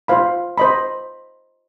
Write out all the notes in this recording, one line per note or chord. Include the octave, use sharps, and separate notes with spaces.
F4 C5 F5 B5
C5 D#5 B5